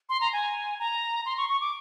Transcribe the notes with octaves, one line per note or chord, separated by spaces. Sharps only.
C6
A#5
G#5
A#5
C6
C#6
C#6
D6